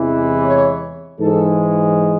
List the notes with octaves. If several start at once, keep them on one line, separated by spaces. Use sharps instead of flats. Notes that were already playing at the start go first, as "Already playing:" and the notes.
Already playing: E2 C3 E3 G#3
C#5
G#2 E3 G#3 A4